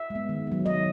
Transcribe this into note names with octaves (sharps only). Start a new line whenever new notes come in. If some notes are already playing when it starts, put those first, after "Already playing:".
Already playing: E5
G#3
B3
D#3
F#3 B3
D#3 D#5